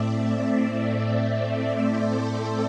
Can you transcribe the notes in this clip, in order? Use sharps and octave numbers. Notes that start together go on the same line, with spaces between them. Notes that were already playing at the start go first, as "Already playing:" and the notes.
Already playing: A2 A3 C4 D5 E5
C5
A4